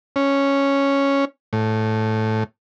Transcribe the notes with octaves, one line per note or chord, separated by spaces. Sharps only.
C#4
A2